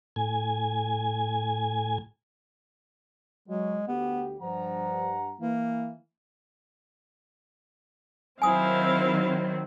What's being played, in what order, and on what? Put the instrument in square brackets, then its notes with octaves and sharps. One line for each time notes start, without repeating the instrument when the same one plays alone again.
[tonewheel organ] A2 G#5
[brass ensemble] F#3 [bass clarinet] G#3
[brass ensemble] D2 G4 [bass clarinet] B3
[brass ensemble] G2 F#5 A#5 [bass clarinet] F3
[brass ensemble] E3 [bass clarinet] A#3
[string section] D#3 F#3 C4 [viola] E4 F5 [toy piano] G#5 D#6